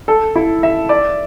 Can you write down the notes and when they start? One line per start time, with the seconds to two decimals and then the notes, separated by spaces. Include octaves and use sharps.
0.08 A4
0.36 E4
0.63 E5
0.89 D5